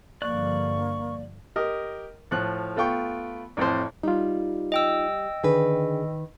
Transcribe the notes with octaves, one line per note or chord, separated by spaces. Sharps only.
G2 D3 F3 A#3 D5 C#6 F#6
G4 A#4 D#5
A2 F3 F#6
A3 B3 F4 G5 C#6
A1 F2 A2 C5
G3 D#4 F4
D#5 G5 E6
D3 D#3 D4 G#4 B4